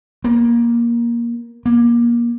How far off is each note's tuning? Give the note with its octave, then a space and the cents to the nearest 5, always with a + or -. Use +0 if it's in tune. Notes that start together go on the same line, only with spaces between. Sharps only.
A#3 +15
A#3 +25